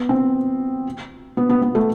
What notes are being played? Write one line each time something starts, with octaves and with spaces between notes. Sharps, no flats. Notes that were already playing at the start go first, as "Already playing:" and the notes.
Already playing: B3
C4
B3
B3
B3
A3